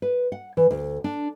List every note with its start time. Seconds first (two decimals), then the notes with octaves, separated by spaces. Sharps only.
0.02 B4
0.32 F#5
0.57 E3
0.71 D2
1.04 D4